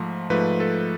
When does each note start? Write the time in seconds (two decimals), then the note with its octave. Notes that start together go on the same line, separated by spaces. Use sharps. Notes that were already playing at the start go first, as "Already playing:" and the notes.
Already playing: G#2 F3 A3
0.30 G#2 F3 A3 B4
0.60 A4